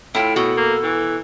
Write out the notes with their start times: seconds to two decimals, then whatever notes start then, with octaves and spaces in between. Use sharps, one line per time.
0.15 A2 E4 F4 G5
0.36 B2 F#4 A4
0.57 A#3
0.83 E3